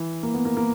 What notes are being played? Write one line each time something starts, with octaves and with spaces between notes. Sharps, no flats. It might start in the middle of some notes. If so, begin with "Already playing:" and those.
Already playing: E3
A#3
B3
A#3
A#3